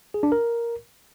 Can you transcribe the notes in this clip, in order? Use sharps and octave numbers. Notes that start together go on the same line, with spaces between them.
G#4
D4
A#4